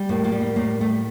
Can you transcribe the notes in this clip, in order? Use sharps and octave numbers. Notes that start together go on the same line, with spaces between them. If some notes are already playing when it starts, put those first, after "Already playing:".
Already playing: G3
A2 A#3
A#3
G3
A#3
A2 A#3
G3 A3